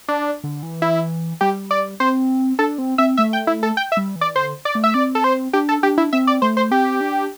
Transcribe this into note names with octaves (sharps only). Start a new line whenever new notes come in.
D4
D3
E3
E4
G3 G4
D5
C4 C5
D4 A4
C4
C4 E5
A3 E5
G5
E4
A4
G5
E5
G3
E3
D5
D3 C5
D5
A3
E5
C4 D5
A4
C5
D4 G4
A4
D4 G4
E4
C4 E5
D5
A3 C5
C5
C4 G4
D4